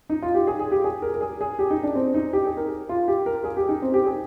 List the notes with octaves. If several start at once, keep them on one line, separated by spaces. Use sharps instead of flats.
D#4
F4
G4
G#4
G#4
G4
G#4
A#4
A#4
G#4
G#4
G4
D#4
D4
C4
D#4
G4
G#4
A#4
F4
G4
A#4
G#4
G4
D#4
C4
G4
G#4